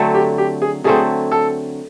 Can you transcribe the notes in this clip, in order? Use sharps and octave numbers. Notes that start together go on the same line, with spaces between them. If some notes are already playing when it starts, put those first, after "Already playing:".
Already playing: D3 F#3 A3 C4
G4
G4
G#4
D3 F#3 A3 C4 G#4
A4